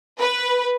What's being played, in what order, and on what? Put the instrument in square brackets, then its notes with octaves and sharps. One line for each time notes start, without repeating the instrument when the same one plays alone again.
[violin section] B4